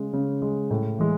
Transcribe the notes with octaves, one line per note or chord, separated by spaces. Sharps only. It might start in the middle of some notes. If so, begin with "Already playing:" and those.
Already playing: C#3 G#3
C#3
G#3
A2
E3 G#3